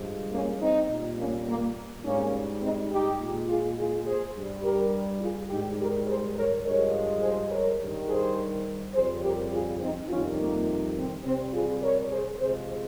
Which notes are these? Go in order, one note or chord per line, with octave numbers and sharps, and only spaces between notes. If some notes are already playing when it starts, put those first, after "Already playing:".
Already playing: G2 F3 G#3
A#3 C#4
C4 D#4
A#2 G3
A#3 C#4
A#3
G#2 G3 A#3 C#4
C4 D#4
D#4 G4
A#2 G#3
F4 G#4
F4 G#4
G#4 C5
G2 G3
G4 A#4
F4 G#4
G#2 D#3 G3 D#4 G4
G4 A#4
G#4 C5
A#4 C#5
G2 F3 G#3 A#4 C#5
G#4 C5
A#4 C#5
G2 D#3 G3
G#4 C5
F2 C#3 G3 G#4 C5
G4 A#4
F4 G#4
C4 D#4
F2 C3 D#3 G3 C#4 F4
A#3
C4
C3 C4
G3
F4 G#4
A#4 C#5
G#4 C5
C3 F3 G#3 G#4 C5